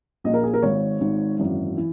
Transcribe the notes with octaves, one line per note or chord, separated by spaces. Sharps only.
A#1 A#2 D#5
A#4
G#4
A#4
G#1 G#2 D#3 C#5
G#1 G#2 D#3
G#1 F#2 E3
E3